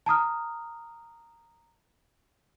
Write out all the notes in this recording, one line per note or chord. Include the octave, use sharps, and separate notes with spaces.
A5 A#5 D#6 F6